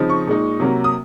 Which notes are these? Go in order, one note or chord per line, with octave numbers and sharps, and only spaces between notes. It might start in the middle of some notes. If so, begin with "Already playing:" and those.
Already playing: C#3 F3 C4 D#4
C#6
A#2 G#3 D#4
C3 F#3 A#3
D#6